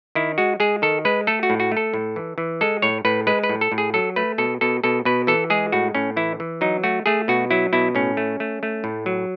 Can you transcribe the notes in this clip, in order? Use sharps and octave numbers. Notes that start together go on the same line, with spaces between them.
D#3 E4
G#3 F#4
G#3 G#4
D#3 A4
G#3 B4
A3 A4
F#4
A2
F#4
A3
A4
A2
E3
E3
G#3 A4
A2 C#5
A2 B4
G#3 B4
B4
A2
A4
A2
G#4
F#3 A4
A3 B4
B2 A4
B2 A4
B2 A4
B2 B4
E3 A4
G#3 G#4
A2 F#4
A2 C#4
E3 E4
E3
F#3 D#4
A3 F#4
A3 G#4
B2 F#4
F#3 E4
B2 E4
A2 C#4
A3
A3
A3
A2
F#3